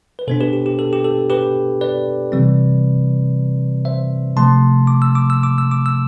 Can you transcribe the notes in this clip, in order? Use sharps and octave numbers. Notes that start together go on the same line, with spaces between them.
B4
B2 B3 D4 A4 C5
G4 B4
G4
G4
A4
G4
A4
G4 B4
B4 D5
C3 E3 G3 C4
C5 E5
C3 F3 A3 A5 C6
D6
E6
D6
E6
D6
E6
D6
E6